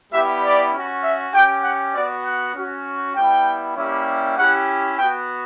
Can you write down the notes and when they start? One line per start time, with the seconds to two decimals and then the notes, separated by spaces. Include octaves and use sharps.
0.12 G3 B3 E4 G4 E5
0.43 D5
0.72 C#4
0.77 F#4
1.03 E5
1.34 C#4 G4 G5
1.64 F#5
1.95 B3 F#4 D5
2.25 F#5
2.55 C#4 F#4
3.15 G3 B3 E4 G5
3.76 G3 A#3 C#4 E4 G4
4.37 C#4 E4 G4 F#5
4.97 B3 F#4 G5